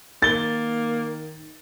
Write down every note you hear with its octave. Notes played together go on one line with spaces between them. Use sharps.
D#3 A#3 A6 G7